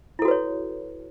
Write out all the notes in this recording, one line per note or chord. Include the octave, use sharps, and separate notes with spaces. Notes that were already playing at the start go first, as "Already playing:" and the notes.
E4 F#4 A4 B4 C#5